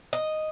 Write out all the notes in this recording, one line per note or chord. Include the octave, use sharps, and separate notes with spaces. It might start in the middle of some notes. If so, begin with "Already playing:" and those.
D#5